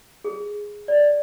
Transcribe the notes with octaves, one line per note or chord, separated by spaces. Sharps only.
G#4
D5